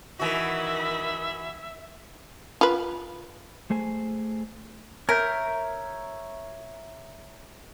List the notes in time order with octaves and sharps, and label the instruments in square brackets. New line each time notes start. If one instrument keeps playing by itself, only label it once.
[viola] D#3 B5 [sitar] E3 F#4 [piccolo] E5
[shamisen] F4 B4
[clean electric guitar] A3 G#4 C5 G#5
[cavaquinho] A#4 [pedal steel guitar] C#5 E5 G6